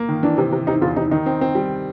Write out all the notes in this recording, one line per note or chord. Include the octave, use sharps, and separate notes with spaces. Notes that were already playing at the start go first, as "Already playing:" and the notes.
Already playing: A#3
D#3
E3 D4
C3
C3
C3 D#4
E2 F4
C3 D#4
D#3 D#4
C4
C4
G3